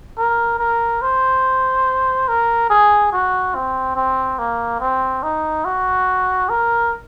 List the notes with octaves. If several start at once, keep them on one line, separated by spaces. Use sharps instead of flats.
A#4
A#4
C5
A#4
G#4
F#4
C4
C4
A#3
C4
D#4
F#4
A#4